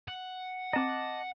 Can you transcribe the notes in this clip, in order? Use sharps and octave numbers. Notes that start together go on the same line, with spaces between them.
F#5
C4 D#5 A5 A#5 D6